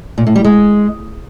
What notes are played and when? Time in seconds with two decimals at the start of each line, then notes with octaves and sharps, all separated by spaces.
0.18 A#2
0.27 A2
0.36 G3
0.44 G#3